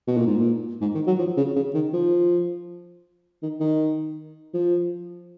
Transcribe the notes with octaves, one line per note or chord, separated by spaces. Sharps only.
B2
A#2
G#2
A#2
G#2
D#3
F#3
F3
C#3
C#3
D#3
F3
D#3
D#3
F3